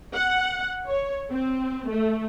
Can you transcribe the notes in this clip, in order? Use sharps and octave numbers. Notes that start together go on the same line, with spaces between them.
F#5
C#5
C4
A3